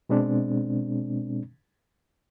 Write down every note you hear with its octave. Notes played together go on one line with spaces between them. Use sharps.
B2 G#3 C4 D4